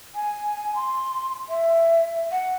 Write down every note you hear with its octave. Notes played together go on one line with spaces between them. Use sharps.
G#5
C6
E5
F#5